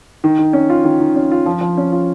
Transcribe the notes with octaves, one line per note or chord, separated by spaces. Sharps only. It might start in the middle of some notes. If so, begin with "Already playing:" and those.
D#3
D#3
C#4
F4
D#3
D#3
C#4
F4
F3
F3
C#4
F4